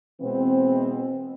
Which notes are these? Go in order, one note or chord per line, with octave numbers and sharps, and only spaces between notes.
B2 E3 G#3 B3 C4